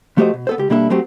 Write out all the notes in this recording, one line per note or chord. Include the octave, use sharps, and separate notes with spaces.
F3 A3 F#4 G4 C5 D#5
B2
B3 A4 C5
C#2 G4
B2 G3 A#3 D4 E4 A4
F#3 A3 C4 F#4 G4